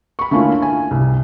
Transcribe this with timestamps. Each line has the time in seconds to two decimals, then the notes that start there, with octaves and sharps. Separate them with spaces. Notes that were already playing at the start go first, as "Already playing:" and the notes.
0.19 B5 C#6
0.31 D3 A3 A#3 C#4 E4 F4
0.62 G#5
0.91 C2